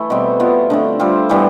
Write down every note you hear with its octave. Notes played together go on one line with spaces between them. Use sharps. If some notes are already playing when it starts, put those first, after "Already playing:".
Already playing: E3 A3 E4
B2 G3 C4
B2 B3 F4
D3 A3 C4
G3 C4 F4
A2 E3 G3 B3